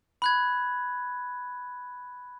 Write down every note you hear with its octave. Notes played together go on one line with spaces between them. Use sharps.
B5 F#6 G#6